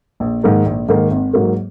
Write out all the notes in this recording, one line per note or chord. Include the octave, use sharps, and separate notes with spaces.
A#1
G#2 D#3 A#3 D#4
A#1
G#2 D#3 A#3 D#4
G#1
G#2 F#3 A#3